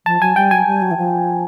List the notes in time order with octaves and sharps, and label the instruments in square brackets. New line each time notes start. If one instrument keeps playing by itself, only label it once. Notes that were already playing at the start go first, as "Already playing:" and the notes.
[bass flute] F3 [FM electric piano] A5
[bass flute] F#3 [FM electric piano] G#5
[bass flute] G3 [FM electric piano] G5
[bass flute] F#3 [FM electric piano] G#5
[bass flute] G3
F#3
E3
F3